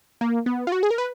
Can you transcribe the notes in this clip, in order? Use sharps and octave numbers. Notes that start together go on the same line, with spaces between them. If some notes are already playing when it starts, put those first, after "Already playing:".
A#3
B3
F4
F#4
G#4
A#4
B4